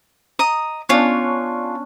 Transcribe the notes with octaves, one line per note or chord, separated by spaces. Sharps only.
D#5 A#5 D#6
B3 C#4 D4 F4 C#5